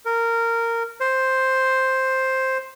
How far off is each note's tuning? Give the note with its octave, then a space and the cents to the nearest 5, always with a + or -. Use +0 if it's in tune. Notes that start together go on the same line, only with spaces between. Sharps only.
A#4 -15
C5 +5